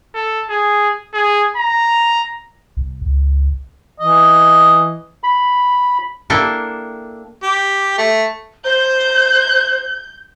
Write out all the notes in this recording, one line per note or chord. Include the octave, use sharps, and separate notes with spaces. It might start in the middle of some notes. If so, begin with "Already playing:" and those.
A4
G#4
G#4
A#5
C2
C#2
E3 D#5
B5
A#3 D4 E4 A4 G5 A5
G4
A3
C5 G6